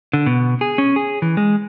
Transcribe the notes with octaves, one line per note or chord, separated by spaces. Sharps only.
D3
B2
G#4
C#4
G#4
E3
G#3